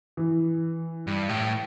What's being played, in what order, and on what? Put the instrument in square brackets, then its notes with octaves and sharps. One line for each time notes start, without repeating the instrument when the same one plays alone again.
[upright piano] E3
[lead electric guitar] G2
A2